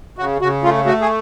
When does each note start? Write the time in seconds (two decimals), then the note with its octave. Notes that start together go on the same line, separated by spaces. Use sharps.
0.18 C#3 F#4
0.41 C#3 F#4
0.63 A3 F4
0.85 A3 F#4
1.01 G#4